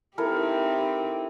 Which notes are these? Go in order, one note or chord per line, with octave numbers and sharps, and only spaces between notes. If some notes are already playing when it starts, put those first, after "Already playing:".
C4 D#4 E4 G4 A4 A#4